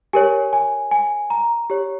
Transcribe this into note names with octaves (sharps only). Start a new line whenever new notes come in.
G4 A#4 C#5 G#5
G#5
G#5
A#5
G4 C#5